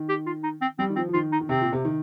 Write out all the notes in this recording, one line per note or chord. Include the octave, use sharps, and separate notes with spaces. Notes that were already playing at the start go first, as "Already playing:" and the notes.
Already playing: D#3
G4
F4
D#4
C4
G3 C4
D#3
F3 C4
F3
D#3 F4
D#4
D#3
C3 C4
A#2
C3
D#3